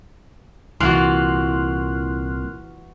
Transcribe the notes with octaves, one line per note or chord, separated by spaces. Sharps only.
C2 A#2 E3 F4 F#4 C6 F6 F#6